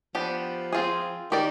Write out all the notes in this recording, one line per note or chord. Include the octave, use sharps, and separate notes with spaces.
F3 B3 D4 G4
C4 F4 G#4
D#3 D#4 G4 D5